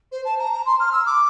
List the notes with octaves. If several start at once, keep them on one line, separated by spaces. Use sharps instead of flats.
C5
A5
A#5
A#5
C6
F6
E6
D6